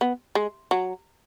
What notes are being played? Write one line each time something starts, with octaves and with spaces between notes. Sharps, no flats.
B3
G#3
F#3